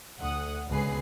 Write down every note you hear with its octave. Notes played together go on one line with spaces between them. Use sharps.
D2 F#5 D#6
C#2 G#2 B2 G#4 B4 C7